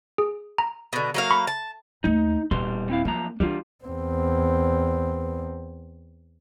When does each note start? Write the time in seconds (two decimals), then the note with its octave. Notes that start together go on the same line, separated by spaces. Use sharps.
0.18 G#4
0.58 A#5
0.93 B2 D3
1.14 F#3 A#3 F5
1.31 B5 C#6
1.47 A5
2.04 D#2 A3 D#4
2.51 D#1 B2 G3 C6
2.90 C4 E4 F5
3.05 F#2 F3 A#3 A#5
3.40 E3 G3 D4 F4
3.84 E2 C4